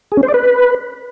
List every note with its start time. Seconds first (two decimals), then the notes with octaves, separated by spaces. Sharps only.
0.12 G#4
0.17 C#4
0.23 C5
0.28 D5
0.34 B4